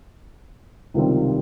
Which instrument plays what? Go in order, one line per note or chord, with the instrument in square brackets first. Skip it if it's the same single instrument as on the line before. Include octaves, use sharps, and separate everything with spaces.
[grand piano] C#2 C3 D#3 G3 C4